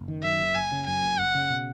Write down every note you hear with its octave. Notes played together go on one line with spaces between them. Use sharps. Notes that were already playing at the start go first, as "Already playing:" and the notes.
Already playing: F#1
D#3
F#2 E5
F#1
F#1 G#5
C#3
F#2 G#5
F#1
F#1 F#5
C#3
B2